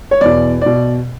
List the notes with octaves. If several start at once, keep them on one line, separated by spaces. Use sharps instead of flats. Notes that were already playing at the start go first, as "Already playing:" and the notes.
C#5
E2 B2 D5
B2 D5